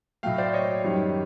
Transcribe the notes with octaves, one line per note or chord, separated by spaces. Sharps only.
A2 F#3 A3 F5 G5
C5 D5
C#5 D#5
F#2 D#3 G3